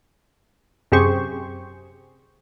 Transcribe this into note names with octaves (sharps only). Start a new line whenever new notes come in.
F#2 C3 G4 G#4 C5 C#6